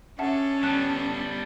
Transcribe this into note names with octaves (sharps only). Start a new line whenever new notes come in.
C#4 D4 A4 E5 F#5 A5
G3 B3 A5 F#6